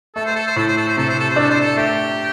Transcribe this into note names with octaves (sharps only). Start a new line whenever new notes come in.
A3 A4
C5
A4
C5
A2 A4
C5
A4
C5
C3 A4
C5
A4
C5
D4 A4
C5
A4
A3 G4